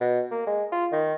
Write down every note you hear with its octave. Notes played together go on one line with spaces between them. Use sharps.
B2
A#3
G#3
F4
D#3